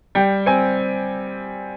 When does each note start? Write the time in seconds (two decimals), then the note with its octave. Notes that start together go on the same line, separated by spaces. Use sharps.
0.15 G3 G5
0.46 C4 G#5